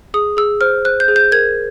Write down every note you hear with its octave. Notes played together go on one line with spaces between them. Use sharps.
G#4 D#6
G#4 E6
C5 F6
C5 F#6
G6
G#4
G6
A#4 G#6